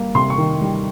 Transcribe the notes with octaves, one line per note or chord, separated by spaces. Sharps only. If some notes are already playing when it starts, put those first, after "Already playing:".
Already playing: G3 A#3
C3 C6
C#6
D#3
G3